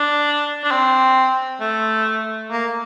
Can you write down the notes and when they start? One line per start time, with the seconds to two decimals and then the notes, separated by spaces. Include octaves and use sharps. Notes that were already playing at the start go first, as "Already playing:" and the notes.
Already playing: D4
0.64 D4
0.71 C4
1.61 A3
2.50 A#3